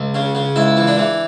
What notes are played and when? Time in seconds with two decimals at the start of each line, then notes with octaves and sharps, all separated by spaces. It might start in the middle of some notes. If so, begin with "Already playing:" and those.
Already playing: C#2
0.15 C#3
0.35 C#3
0.56 C#2 E4
0.77 E3
0.87 D4
0.98 E3